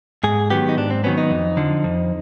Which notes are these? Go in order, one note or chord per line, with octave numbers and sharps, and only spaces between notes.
G#2 G#4
D#3 F#3 B3 G4
D#4
G#2 D4
C4
D#3 F#3 B3 C#4
D#4
F2
D3 F3
F2